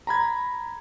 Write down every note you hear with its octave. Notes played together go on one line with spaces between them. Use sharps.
A#5 B5 G#6